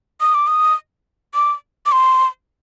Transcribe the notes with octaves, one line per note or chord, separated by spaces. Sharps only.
D#6
D6
D#6
D6
D6
C6